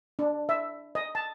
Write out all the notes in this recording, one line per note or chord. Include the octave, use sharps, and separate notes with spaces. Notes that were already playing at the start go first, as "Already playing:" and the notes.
D4
E5
D#5
A5